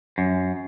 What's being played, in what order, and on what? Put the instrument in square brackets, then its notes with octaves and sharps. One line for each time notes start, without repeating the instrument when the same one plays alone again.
[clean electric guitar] F#2